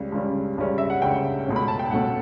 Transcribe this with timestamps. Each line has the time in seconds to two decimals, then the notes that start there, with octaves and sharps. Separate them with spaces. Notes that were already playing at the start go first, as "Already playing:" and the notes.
Already playing: C#2 C#3 G3 C#4
0.12 C#2 C#3 G3 C#4
0.58 C#2 C#3 G3 C#4
0.78 E5
0.90 F#5
1.02 C#2 C#3 G3 C#4 G5
1.47 C#2 B2 A3 C#4
1.56 B5
1.68 A5
1.79 G5
1.91 C#2 B2 A3 C#4 F#5